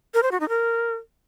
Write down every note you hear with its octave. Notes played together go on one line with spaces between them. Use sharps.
A#4
C5
F#4
D#4
A#4